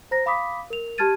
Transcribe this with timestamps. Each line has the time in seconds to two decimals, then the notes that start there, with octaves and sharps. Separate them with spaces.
0.11 C5 A#5 A#6
0.26 F5 B5 D6 D#6 B6
0.70 A#4 F7
0.98 G4 A5 F6 G#6 A6 D#7